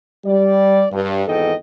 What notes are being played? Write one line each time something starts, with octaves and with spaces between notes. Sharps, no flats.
G3 D5
G2
G#1 E2 G#2 A4 D#5 G5